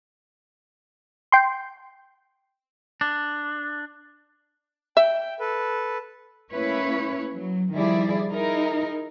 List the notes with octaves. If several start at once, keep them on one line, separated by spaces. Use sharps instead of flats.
G5 C6
D4
E5 G5
G5
A4 B4
A3 A#3 C#4 E4 B4 C#5
F#3
D#3 F3 G3 E4 G#4 D5
D#4 E4 G#4 A#4